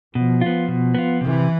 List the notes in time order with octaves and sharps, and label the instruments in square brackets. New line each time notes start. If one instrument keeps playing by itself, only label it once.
[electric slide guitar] B2 [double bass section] F3
[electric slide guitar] B3 F4
B2
B3 F4
[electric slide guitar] C3 [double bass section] E3